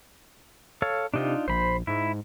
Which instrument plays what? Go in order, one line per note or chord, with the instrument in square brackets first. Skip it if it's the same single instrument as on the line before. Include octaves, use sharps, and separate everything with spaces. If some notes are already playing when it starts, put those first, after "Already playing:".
[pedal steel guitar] A4 C#5 F5
[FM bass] C3 [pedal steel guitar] D4 D#4 F4
[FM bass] A#1 [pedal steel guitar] C5 B5
[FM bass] G#2 [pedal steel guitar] E4